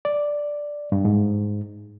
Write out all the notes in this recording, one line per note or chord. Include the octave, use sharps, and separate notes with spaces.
D5
G2
G#2